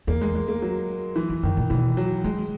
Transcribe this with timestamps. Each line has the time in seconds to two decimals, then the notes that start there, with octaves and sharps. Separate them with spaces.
0.07 E2 A#3
0.22 G#3
0.35 G#3
0.48 A#3
0.62 F#3
1.16 E3
1.30 E2
1.43 F#2 D#3
1.57 A#2
1.70 B2 E3
1.97 F#3
2.24 D#3 G#3